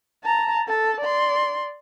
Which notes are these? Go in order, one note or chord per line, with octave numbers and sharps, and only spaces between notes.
A5 A#5
A4 A5
D5 C6